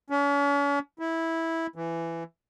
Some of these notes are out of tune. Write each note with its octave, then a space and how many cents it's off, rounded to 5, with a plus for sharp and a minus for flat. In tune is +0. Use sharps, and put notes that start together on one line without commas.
C#4 +40
E4 -10
E3 +15